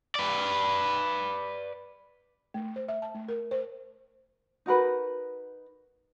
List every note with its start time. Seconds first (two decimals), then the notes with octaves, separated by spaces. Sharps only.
0.15 B4 D5
2.54 A3
2.76 C5
2.88 E5
3.02 A5
3.14 A3
3.28 A#4
3.51 C5
4.66 D#4 F#4 A#4 B4